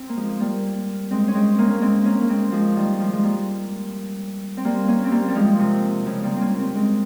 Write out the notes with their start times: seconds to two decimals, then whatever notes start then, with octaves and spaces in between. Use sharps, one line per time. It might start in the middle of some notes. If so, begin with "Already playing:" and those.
Already playing: C4
0.09 A#3
0.17 F3 G#3
0.40 G3 A#3
1.11 G#3 C4
1.28 C#4
1.35 G#3 C4
1.58 A#3 C#4
1.70 A#3
1.81 G#3 C4
2.05 A#3 C#4
2.22 A#3
2.29 G#3 C4
2.52 F3 G#3
2.76 D#3 G3
2.99 F3 G#3
3.13 G#3
3.23 G3 A#3
4.57 C4
4.64 G3 A#3
4.88 A#3 C#4
5.04 C4
5.11 G3 A#3
5.29 G3
5.35 F3 G#3
5.59 C3
6.06 C#3 F3
6.23 G3 A#3
6.36 C4
6.41 A#3 C#4
6.59 C4
6.67 C#4
6.75 G#3 C4